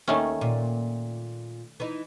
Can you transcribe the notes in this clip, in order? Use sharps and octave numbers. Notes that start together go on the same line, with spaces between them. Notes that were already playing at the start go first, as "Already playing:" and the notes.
D#2 D#3 A3 C#4
A#2
E3 D#4